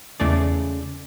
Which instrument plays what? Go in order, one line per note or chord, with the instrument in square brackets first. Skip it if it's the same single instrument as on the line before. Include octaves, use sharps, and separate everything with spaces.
[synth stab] E2 A3 D5 [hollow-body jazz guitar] C#3 G#3